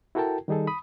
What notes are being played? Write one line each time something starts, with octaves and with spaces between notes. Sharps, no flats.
E4 F#4 A4 A#4 G5 A5
D#3 G3 D#4 G#4 A4
B5 D#6